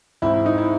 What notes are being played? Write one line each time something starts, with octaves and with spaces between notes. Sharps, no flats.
G#2 E3 C4 E4
E4
D#4
E4